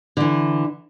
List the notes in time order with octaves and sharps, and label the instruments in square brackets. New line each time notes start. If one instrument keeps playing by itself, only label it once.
[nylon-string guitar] D3 E3